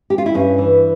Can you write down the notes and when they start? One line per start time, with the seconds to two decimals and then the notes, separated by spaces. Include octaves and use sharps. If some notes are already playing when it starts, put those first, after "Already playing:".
0.10 G4
0.18 F4
0.26 E4
0.34 G2 C#4
0.58 E3